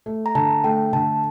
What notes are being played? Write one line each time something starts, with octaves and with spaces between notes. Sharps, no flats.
A3
A#5
D3 A5
A3 G5
D3 A5